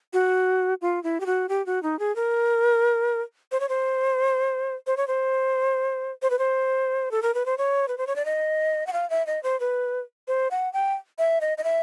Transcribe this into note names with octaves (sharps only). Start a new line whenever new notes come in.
F#4
F4
E4
G4
F#4
G4
F#4
D#4
G#4
A#4
C5
C#5
C5
C5
C#5
C5
C5
B4
C5
A4
A#4
B4
C5
C#5
B4
C5
C#5
D5
D#5
F#5
F5
E5
D#5
C5
B4
C5
F#5
G5
E5
D#5
D#5
E5